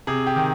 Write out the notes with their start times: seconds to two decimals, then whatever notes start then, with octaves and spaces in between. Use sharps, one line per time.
0.07 C3 G#4
0.27 G4
0.36 D#3